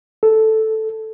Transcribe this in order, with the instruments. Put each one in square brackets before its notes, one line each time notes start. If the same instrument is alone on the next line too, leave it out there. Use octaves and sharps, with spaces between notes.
[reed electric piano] A4